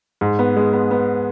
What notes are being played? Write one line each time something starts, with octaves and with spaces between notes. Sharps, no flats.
G#2
B3
G#3
B3
B3